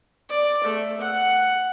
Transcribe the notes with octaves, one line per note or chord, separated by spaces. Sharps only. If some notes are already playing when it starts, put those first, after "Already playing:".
D5
A3
F#5